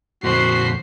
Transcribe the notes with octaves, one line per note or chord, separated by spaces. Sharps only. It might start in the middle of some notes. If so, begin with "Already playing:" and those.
F2 A#2 F#4 C5 B5 C6 C7